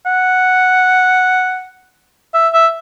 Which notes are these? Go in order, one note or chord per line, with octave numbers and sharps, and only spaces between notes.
F#5
E5
E5